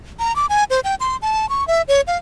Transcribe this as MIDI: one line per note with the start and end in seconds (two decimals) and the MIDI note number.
0.19 0.35 82
0.36 0.46 86
0.49 0.64 80
0.70 0.80 72
0.84 0.95 79
1.00 1.17 84
1.22 1.48 81
1.49 1.66 85
1.68 1.82 76
1.88 2.01 73
2.07 2.17 77